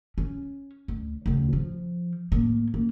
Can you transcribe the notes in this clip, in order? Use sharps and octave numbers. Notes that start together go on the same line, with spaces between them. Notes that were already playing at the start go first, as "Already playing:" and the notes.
C#4
D2
D2 C#3
F3
A2 A#3
A#3